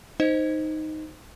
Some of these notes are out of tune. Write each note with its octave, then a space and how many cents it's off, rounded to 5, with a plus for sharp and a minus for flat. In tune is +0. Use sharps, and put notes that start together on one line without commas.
D#4 +0 C5 -5 D#5 +0